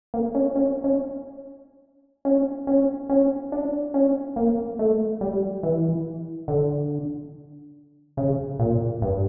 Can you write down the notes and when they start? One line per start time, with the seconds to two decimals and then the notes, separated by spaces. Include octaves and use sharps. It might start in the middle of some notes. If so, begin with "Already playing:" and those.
0.14 A#3
0.35 C#4
0.56 C#4
0.84 C#4
2.25 C#4
2.67 C#4
3.10 C#4
3.52 D4
3.94 C#4
4.36 A#3
4.79 A3
5.21 G3
5.63 E3
6.48 D3
8.17 C#3
8.59 A#2
9.02 G2